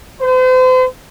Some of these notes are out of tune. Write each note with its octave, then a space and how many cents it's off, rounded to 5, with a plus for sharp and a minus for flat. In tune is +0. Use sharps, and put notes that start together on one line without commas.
C5 -40